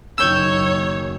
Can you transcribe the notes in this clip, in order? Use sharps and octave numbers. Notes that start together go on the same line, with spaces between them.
F#1 D#3 F#3 C#5 E6 G6 G#6